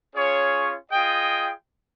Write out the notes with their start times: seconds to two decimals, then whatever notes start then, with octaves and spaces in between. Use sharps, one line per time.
0.13 C#4 F4 G#4 C#5
0.91 F4 G#4 D#5 G5